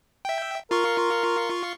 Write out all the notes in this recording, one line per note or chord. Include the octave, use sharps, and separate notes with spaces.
E5 G5
F4 A#4 C6 C#6